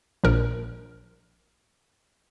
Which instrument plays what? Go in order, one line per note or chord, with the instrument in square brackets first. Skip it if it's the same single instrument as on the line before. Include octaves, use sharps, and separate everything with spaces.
[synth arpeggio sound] A#1 A#2 F3 A#4